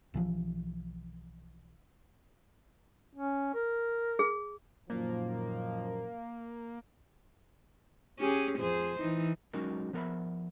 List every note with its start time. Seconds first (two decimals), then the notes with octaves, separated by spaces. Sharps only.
0.14 B1 E3 F3
3.15 C#4
3.55 A#4
4.19 G#4
4.90 F#2 A#2 D#3 F3 A#3
8.19 C#4 G4 G#4
8.59 F2 G#4 C5
9.00 E3 D#4
9.53 F#3 G#3 C#4 D#4 F#4 A#4
9.93 F3 B3 A#4 D5 E5 B5